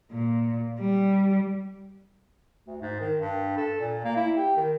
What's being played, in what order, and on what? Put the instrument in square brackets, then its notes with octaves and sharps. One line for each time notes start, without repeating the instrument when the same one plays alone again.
[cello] A#2
G3
[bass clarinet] D2
G#2
D#3
G2
A4
A#2
A#3
E4
G4
D#3